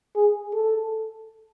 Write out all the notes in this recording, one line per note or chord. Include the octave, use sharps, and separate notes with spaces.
G#4
A4